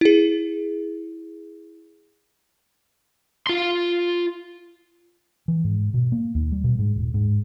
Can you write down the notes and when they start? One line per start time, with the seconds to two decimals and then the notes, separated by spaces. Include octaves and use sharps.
0.01 E4 G#4
3.47 F4 C6
5.48 E3
5.64 G#2
5.94 B2
6.12 A#3
6.35 D#2
6.52 G3
6.64 B2
6.79 G#2
6.96 D#1
7.14 G#2